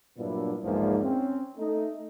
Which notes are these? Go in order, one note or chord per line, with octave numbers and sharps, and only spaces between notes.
G2 A#2 F#3 B3 D4 E4
B1 E2 G#2 F3 G#3 A#3
C4 C#4
A3 D#4